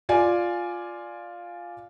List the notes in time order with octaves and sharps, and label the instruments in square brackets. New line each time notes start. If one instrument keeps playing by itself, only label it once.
[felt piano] F4 D5 G#5